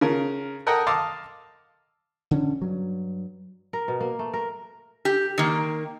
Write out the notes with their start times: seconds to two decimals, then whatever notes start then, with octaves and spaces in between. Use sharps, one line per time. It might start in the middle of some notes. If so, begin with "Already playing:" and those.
0.01 C#3 F4 A#4
0.66 A4 A#4 D#5 F#5 G5 A#5
0.87 D#5 F5 A5 C6 D6 E6
2.31 D3 C#4
2.62 G2 F#3
3.73 A#4
3.88 B2
4.01 A#3
4.19 A3
4.34 A#4
5.05 G4
5.38 D#3 A#3